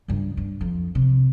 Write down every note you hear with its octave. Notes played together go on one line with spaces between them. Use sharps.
C#2 G2
G2
F2
C3